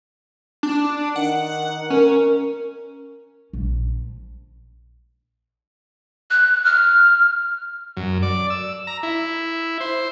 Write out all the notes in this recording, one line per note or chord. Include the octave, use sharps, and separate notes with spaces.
D4
D#3 F#5
C#4 A#4
A#1
F#6
F6
F#2
D5
E6
A#5
E4
C5